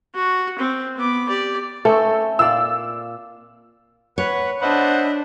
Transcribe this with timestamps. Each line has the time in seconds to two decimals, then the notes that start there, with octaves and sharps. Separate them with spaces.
0.15 F#4
0.58 C4
0.97 B3 D6
1.28 G4 D5
1.85 A3 C4 C#4 A4
2.39 A#2 F4 D5 E6
4.18 B4 C#5 F#5
4.62 D4 C5 D#5 E5 F#5 B5